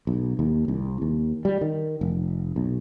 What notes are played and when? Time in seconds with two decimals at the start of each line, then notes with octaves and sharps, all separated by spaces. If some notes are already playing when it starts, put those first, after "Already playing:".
0.07 B1
0.39 D#2
0.68 C2
1.02 D#2
1.45 G3
1.61 D#3
2.01 F1
2.56 B1